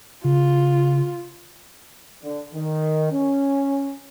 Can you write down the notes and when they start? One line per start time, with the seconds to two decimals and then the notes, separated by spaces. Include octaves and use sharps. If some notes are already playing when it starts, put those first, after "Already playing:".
0.24 C#3 F4
2.23 D3
2.54 D#3
3.12 C#4